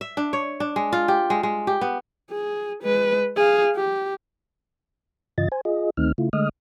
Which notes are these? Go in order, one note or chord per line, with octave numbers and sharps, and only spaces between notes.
E5
D4
C#5
D4
G#3
F4
G4
G#3
G#3
G4
B3
G#4
G#3 B4
G#4 F5
G4
G2 C#3 E3 F4 D#5 A6
C5 G#5
F4 G#4 D#5
D2 D#3 A3 C4 D#4 F6
C#3 A3 E4 F4
D3 G#3 A3 D#5 D#6 F6